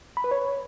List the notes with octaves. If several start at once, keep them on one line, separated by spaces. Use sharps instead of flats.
B5
B4
C#5